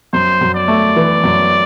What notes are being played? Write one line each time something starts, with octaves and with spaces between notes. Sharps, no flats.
F#2 C5
F#2
D5
A3
E3
F#2